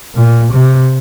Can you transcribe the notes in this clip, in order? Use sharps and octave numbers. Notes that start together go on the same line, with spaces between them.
A#2
C3